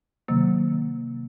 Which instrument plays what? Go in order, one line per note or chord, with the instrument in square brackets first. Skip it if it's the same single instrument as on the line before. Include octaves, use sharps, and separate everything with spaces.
[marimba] C3 D#3 F#3 A#3